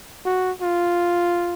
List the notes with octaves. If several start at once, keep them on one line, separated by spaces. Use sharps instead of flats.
F#4
F4